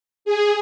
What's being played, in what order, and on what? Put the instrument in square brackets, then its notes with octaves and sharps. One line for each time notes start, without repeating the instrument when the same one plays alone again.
[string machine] G#4